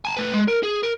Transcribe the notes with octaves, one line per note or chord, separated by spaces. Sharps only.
G#5 A5
A3 B4
G#3
A#4
G#4
A#4